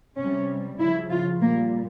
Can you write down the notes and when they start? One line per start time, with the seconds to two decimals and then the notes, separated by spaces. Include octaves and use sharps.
0.18 C3 G3 C#4
0.79 C#3 F3 E4
1.10 F4
1.41 A#2 G3 A#3